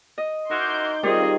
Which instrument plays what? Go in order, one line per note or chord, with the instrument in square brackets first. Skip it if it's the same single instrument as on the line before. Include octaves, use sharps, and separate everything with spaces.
[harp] D#5
[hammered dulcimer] D#4 [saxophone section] E4 F#4 A#4 [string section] C6 D6 G6
[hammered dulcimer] D#3 [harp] G3 [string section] C4 F4 D#5 [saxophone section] G#4